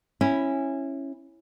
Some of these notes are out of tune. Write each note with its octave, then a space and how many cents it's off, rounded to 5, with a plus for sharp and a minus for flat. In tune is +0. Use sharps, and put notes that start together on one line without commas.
C#4 -15 E4 +0